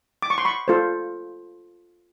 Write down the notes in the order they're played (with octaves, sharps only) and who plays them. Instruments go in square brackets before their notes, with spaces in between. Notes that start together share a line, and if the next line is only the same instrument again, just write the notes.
[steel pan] D6
C#6
C6
B5 C#6
F4 A4 C5